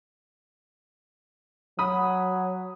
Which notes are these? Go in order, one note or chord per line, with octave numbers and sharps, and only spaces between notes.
F#3 B5 D#6